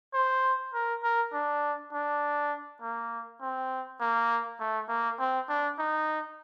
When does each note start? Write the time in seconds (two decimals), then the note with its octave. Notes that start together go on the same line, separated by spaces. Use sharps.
0.14 C5
0.73 A#4
1.03 A#4
1.33 D4
1.93 D4
2.81 A#3
3.41 C4
4.00 A#3
4.59 A3
4.89 A#3
5.19 C4
5.49 D4
5.78 D#4